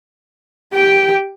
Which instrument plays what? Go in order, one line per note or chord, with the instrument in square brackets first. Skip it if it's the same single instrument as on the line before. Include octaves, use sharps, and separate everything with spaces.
[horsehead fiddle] G4 G5